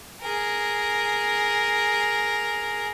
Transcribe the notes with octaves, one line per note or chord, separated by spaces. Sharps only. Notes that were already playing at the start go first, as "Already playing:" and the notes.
G#4 A#4